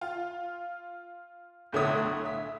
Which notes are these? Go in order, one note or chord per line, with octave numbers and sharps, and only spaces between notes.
F4
B1 A2 D3 C#5 E5 D#6
E5